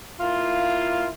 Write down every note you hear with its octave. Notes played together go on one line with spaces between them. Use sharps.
A#3 E4 F4